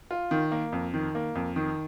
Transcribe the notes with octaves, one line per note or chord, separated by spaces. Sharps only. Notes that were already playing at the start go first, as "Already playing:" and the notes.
F4
D#3
A#3
F2
D#3
A#3
F2
D#3